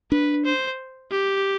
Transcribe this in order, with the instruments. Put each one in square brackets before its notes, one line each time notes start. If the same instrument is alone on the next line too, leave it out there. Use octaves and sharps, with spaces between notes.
[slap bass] D4 [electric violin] B4
[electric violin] C5
G4